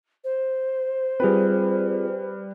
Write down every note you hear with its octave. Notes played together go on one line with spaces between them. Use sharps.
C5
G3 C4 F4 G#4 B4